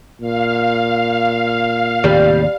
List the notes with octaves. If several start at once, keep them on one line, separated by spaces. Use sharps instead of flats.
A#2 F5
D#2 A2 C3 G3